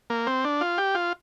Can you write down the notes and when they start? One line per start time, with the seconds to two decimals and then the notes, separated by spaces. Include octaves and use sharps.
0.10 A#3
0.27 C4
0.44 D4
0.61 F4
0.78 G4
0.95 F4